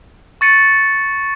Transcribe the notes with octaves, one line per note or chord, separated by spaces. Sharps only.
C#6 A6 C#7 D#7